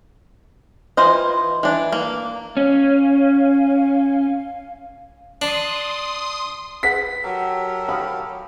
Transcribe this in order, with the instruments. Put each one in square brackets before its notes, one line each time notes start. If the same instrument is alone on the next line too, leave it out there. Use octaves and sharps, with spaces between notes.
[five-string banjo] E3 F4 C5 D#5
E3 D4
A#3
[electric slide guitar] C#4 [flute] F5
[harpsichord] D4 [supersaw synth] C6 D#6
[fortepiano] G#4 B4 F#5 [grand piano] B6
[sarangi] F#3 [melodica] G4 A4 A#4
[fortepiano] F5 B5 D#6